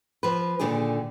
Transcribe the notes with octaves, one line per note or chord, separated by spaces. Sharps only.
F3 B4
A#2 D3 D#3 D4 G#4